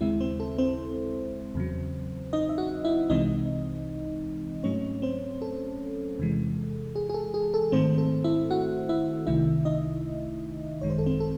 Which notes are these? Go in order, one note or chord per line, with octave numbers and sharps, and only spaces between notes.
D#2 C#3 G#3 C4 E4 E5
C4 C5
A4
C4 C5
E2 C#3 F#3
D#4 D#5
E5
F#4 F#5
E4 E5
C2 C3 E3 G#3 C4 D#4 D#5
G#2 F#3 A3 C4 C#4 C#5
C4 C5
A4
E2 C3 E3 G#3
G#4
G#4
A4
G#4
A4
G#2 D#3 A3 C4 C5
A4
E4 E5
F#4 F#5
E4 E5
C2 C3 D#3 A3 E4 E5
D#4 D#5
G#1 F#2 D#3 G#3 C#5
C5
A4
C4 C5
A4